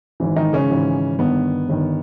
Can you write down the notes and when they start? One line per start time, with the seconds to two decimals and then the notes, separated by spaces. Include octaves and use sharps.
0.20 G#1 G#2 E3
0.36 D#3 D#4
0.53 C#3 C#4
0.70 G#1 G#2 E3
1.19 G1 G2 D#3 B3
1.69 G1 G2 D#3